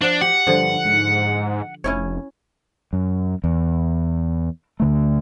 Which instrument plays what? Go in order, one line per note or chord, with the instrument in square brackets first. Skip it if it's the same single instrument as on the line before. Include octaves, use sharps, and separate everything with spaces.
[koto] F3 D5 F#5 [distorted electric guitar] D4
[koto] G4 [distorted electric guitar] F#5
[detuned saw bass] G2 [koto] D3 F3
[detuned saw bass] G#2
[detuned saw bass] F1 [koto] C#4 E4 C#5
[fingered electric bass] F#2
E2
D2 D3 A3